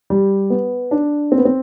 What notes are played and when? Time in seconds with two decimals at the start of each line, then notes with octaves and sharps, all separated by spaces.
0.10 G3
0.50 B3
0.91 D4
1.32 C4
1.38 B3
1.45 C4